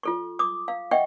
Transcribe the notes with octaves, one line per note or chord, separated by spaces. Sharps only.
F4 A4 C#6
D6 D#6
F5
D#5 E5 F#5 G5 C#6